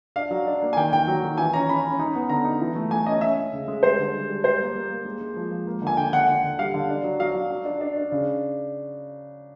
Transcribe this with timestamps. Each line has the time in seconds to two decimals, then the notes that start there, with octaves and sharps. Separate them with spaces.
0.16 D4 F5
0.31 F#3
0.47 D4
0.62 A#3
0.73 G#5
0.76 D#3 G5
0.93 D#3 G5
1.07 F#3
1.23 D#3
1.38 E3 G#5
1.54 C#4 A#5
1.69 C#4 B5
1.85 C#4
1.99 D#4
2.15 B3
2.29 D3 A#5
2.45 D#4
2.61 E3
2.75 A3
2.91 A3 G#5
3.06 C#4 D#5
3.21 C#4 E5
3.37 C#4
3.53 C#3
3.68 G#3
3.83 G3 C5
3.99 D3
4.14 G3
4.29 G3
4.44 G3 C5
4.60 A#3
4.75 A#3
4.90 A#3
5.05 G#3
5.21 G#3
5.36 F3
5.51 F3
5.67 A#3
5.82 D3
5.87 G#5
5.97 D3 G5
6.13 D3 F#5
6.28 D3
6.44 D3
6.59 G3 F5
6.74 D3
6.89 D4
7.04 F#3
7.19 F#3 F5
7.35 F#3
7.51 F#3
7.65 D4
7.81 D4
7.97 D4
8.12 C#3